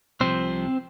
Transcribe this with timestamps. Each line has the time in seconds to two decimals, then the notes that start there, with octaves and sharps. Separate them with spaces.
0.21 C2 C3 F3 C4 C5